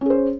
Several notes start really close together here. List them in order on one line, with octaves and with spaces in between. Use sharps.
C#4 G#4 C5